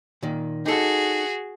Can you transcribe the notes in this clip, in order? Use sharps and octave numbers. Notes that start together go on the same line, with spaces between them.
A#2 D#3
D#4 F#4 G#4 A4